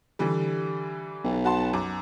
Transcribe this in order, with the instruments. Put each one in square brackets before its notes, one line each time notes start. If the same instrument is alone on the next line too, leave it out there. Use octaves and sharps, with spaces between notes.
[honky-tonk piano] D3 E3 G3
[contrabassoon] B1
[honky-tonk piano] F#4 A5 C6
F#2 D6